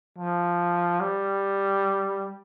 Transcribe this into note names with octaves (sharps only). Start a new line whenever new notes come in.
F3
G3